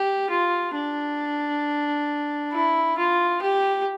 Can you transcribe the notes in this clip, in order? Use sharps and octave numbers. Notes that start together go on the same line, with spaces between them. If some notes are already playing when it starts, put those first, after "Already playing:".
Already playing: G4
F4
D4
E4
F4
G4